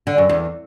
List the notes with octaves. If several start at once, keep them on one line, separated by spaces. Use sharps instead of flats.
D3
F#2
E2